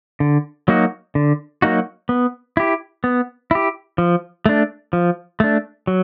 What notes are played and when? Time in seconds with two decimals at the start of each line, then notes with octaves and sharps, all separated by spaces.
0.20 D3
0.68 F#3 A#3 D#4 F#4
1.15 D3
1.62 F#3 A#3 D#4 F#4
2.09 B3
2.57 E4 G4
3.04 B3
3.51 E4 G4
3.98 F3
4.46 A3 D4
4.93 F3
5.40 A3 D4
5.87 F#3